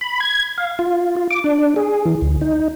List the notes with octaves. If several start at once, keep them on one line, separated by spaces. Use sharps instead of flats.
B5
G#6
F5
F4
F4
D6
D4
G#4
E3
D2
D#4